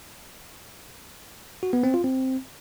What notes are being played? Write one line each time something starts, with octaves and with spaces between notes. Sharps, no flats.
F#4
B3
C4
F4
C4